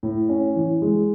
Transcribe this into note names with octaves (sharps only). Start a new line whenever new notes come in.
A2
C#4
E3
G#3